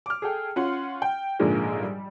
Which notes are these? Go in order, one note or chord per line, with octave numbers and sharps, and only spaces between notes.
D6 F6
G#4 A4 G5
C#4 F4 F#5 C6
G5
A#1 G#2 D3 F3 G#3 A#3
G3